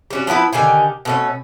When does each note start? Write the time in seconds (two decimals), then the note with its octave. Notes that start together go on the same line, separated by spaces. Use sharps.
0.11 G3 C#4 F#4
0.27 F3 B3 E4 B4
0.53 D3 D#3 G4 G#5
1.05 B2 A3 C#4